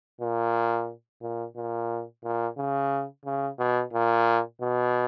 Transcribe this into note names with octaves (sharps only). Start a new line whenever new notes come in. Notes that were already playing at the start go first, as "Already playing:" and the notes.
A#2
A#2
A#2
A#2
C#3
C#3
B2
A#2
B2